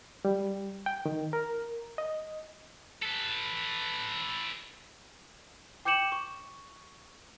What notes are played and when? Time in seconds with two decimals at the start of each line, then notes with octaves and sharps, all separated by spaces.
0.25 G3
0.86 G5
1.06 D#3
1.33 A#4
1.98 D#5
3.03 A4 B4
5.85 G5 D6 G6 C#7 E7 F#7
6.12 C#6